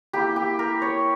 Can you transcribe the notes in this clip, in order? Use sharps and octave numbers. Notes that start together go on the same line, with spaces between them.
A#3 E4 G4
G4
A#4
C#5